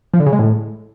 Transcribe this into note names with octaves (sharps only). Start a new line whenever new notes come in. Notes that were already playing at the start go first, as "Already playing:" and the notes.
F3
D3
C#3
G#3
A2